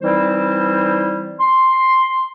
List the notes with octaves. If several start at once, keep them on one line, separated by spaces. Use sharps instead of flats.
E3 G3 C4 D#4 E4 C5
C6